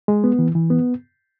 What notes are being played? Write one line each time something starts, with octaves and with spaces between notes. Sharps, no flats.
G#3
B3
E3
E3
B3